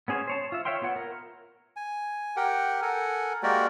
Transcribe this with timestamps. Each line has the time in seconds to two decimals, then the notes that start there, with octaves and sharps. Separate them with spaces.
0.08 B3 C#4 G#4 C5 C#5
0.27 C5 C#5 A5
0.52 F4 E5
0.65 C#5 E5 F5 G5 C6
0.82 B3 F4 C#5 F#5
0.96 A#4
1.76 G#5
2.36 G4 A#4 F#5 G5
2.82 A4 A#4 F#5 G#5
3.43 G#3 A#3 F#4 G4 A#4 D5